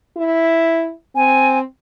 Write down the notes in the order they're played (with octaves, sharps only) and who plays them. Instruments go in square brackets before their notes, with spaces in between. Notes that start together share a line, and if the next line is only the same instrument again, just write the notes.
[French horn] E4
[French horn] C4 [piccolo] G#5